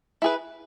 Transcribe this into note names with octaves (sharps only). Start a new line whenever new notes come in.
E4 G#4 B4